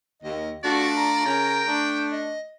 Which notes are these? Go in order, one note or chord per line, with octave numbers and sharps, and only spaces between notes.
D#2 D#5
A3 D4 F4 F#4 D5
A#5
C#3 C#4 A#4 G5
A3 D4
D#5